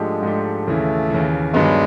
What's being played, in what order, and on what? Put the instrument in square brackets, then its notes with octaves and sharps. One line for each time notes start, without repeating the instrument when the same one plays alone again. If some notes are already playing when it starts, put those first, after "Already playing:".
Already playing: [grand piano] G#2 F3 A3 D4 G4 [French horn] G#3
[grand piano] G#2 F3 A3 D4 G4
[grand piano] D#2 C#3 E3 [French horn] A3
[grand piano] D#2 C#3 E3
[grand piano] G2 D#3 F#3 B3 D4 [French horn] G#3